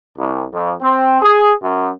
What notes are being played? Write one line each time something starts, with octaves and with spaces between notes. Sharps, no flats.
C2
F2
C4
G#4
F#2